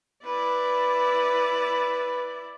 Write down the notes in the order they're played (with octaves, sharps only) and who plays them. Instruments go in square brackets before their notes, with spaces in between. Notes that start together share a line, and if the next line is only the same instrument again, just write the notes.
[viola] E4 D5 [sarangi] B4